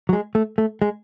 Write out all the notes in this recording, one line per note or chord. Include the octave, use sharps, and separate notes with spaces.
F#3
G#3
A3
A3
G#3